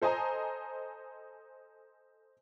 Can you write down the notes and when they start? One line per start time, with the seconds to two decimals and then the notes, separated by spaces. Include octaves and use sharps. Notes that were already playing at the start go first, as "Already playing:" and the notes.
0.02 A4 C5 D#5 G#5 A#5